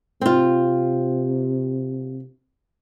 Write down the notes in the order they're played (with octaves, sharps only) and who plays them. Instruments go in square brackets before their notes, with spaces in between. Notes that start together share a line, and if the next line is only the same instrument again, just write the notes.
[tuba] C3 [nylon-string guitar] C4 F4